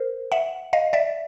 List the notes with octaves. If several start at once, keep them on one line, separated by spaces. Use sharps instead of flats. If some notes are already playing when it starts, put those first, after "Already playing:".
Already playing: A#4 C5
E5 F#5
D#5 F5
D5 E5